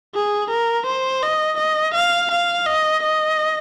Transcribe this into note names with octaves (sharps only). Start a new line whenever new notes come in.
G#4
A#4
C5
D#5
D#5
F5
F5
D#5
D#5